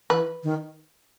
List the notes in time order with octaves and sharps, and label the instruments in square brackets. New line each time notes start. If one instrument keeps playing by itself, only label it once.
[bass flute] E3 [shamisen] B4
[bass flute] D#3